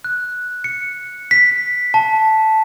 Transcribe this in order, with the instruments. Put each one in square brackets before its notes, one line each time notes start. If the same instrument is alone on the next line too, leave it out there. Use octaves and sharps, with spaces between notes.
[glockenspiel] F#6
C#7
B6
A5